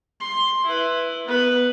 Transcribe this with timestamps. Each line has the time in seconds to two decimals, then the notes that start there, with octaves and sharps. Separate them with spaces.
0.20 C6
0.65 E4 B4
1.25 B3 B4